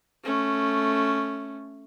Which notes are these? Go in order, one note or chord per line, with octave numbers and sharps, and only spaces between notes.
A3 C#4